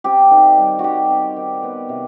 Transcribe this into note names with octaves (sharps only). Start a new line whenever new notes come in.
C4 G4
D#3
G3
D#3 F#4 G4
C4
D#3
B3
C3